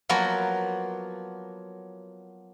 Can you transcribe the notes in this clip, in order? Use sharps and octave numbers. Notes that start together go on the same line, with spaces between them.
F3 F#3 A#3 B3 F#4 B4